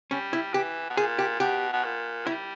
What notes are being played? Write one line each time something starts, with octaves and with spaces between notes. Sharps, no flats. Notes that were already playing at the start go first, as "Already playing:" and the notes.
G3 C#4
E4
E3 G4
B2
A#2 G#4
G4
B2 G4
B2
A#2
G3 E4